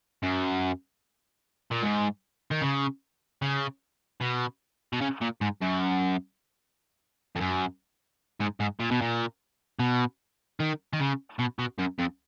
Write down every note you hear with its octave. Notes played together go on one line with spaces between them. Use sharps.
F#2
A#2
G#2
D#3
C#3
C#3
B2
B2
C#3
A#2
G#2
F#2
F2
F#2
G#2
G#2
A#2
B2
A#2
B2
D#3
D#3
C#3
B2
B2
F#2
F2